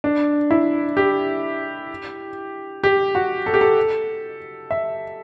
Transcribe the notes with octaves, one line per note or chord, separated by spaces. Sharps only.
D4
E4
G4
G4
F#4
A4
G4
A4
E5